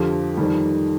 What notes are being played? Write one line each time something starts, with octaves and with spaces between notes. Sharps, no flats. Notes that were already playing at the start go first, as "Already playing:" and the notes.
Already playing: F2 D3 F3 G4
F2 D#3 G3